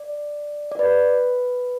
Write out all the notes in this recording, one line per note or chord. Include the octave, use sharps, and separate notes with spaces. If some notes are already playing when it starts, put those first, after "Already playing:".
Already playing: D5
D5
B4